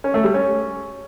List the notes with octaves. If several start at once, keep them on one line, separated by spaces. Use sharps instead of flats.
C#4
A3
G3
C#4